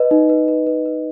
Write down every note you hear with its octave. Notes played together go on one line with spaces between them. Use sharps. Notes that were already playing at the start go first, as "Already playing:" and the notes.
Already playing: B4 D#5
D#4
B4
B4
B4
B4